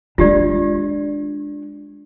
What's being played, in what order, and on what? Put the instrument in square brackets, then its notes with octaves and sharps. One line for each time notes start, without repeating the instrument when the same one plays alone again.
[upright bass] G#3 D4 [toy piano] F4 G4 D5